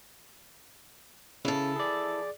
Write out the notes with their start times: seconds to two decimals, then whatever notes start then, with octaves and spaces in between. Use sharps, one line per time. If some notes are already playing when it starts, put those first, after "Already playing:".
1.45 C#3 E3 A4
1.76 G#4 D5